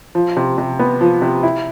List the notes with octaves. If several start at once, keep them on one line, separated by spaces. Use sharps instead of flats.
F3
C3
C3
B3
F3
C3
E4